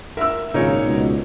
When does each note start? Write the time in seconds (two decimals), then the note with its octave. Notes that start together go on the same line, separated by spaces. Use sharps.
0.17 A#4 E5 E6
0.54 G#1 A#2 C#3 D#4 A#4 C#5
0.85 C#2 B2